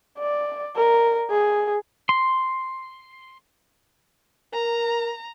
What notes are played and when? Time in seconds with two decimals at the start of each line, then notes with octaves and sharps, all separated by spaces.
0.18 D5
0.76 A#4
1.30 G#4
2.09 C6
4.54 A#4 A#5